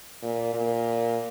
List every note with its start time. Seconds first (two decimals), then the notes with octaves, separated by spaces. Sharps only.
0.22 A#2
0.53 A#2